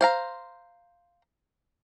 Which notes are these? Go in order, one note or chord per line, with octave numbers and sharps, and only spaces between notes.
C5 F5 A#5